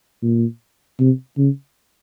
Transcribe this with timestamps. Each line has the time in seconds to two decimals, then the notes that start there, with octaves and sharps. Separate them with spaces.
0.23 A#2
1.00 C3
1.37 C#3